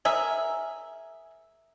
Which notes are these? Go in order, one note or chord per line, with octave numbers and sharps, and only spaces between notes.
G#4 A#4 E5